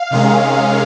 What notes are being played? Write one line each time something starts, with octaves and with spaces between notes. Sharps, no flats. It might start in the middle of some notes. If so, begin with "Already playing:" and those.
Already playing: F5
C3 D#3 G#3 C#4